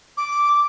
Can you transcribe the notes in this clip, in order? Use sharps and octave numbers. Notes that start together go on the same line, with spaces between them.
D6